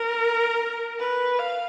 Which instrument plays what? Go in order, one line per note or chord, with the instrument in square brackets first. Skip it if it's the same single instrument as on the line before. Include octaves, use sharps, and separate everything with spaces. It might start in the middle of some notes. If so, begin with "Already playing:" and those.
Already playing: [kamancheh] A#4
B4
F5